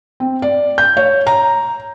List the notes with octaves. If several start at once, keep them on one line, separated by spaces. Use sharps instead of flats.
C4
D5
G6
C#5
A#5